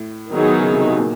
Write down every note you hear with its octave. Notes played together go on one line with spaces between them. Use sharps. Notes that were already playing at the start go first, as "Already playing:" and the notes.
Already playing: A2
D#3 F#3 B3 D#4 G#4
C#3
C3
B2
A#2